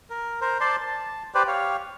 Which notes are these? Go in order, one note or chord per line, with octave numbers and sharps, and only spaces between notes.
A#4
A#4 C5
C5 D5 A5 C6
A5
G4 B4 C5 D5
G4 C#5 F5